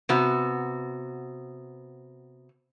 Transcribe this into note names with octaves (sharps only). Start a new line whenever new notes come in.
C3 B3 F#4